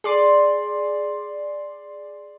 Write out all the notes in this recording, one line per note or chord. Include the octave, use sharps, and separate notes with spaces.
G#4 D5 C6